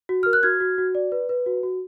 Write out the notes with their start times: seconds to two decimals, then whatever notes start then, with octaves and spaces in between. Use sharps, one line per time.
0.09 F#4
0.23 A#4 F6
0.33 F#6
0.43 F#4 F6 G#6
0.61 F#4
0.78 F#4
0.95 D5
1.12 B4
1.29 B4
1.46 F#4
1.63 F#4